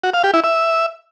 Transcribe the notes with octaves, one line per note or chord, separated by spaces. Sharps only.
F#4
F5
G4
E4
E5